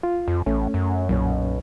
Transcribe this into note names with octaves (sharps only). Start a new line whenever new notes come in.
F4
F2
A1 A3 C#4
F#2
B1 F#2 A#2 C#4